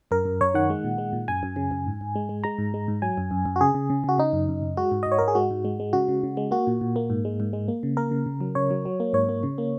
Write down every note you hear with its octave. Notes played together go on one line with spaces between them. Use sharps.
F#2 A#4
F#2
F#2 C#5
D#3 F#5
G#3
A#2
G#3
A#2
F#2 G#5
F#2
C#3
F#2
G#2
G#2
G#3
G#3
G#3 A#5
G#2
G#3
G#2
F#3 G#5
F#2
F#2
F#2
F#4
C#3 G#4
C#3
C#3
C#3 F#4
C#3 D#4
F#2
F#2
F#2
G#3 F#4
G#2
D#5
G#2
C#5
G#2 A#4
G#4
G#3 F#4
G#2
G#3
G#3
C#3 F#4
C#3
C#3
G#3
A#3 F#4
A#2
A#2
A#3
G#2
G#3
G#2
G#3
A#3
C#3
A#3 A#4
C#3
C#3
F#3
C#3 C#5
F#3
F#3
A#3
G#2 C#5
A#3
C#3
A#3